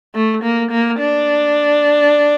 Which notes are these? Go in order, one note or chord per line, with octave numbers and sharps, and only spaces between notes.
A3
A#3
A#3
D4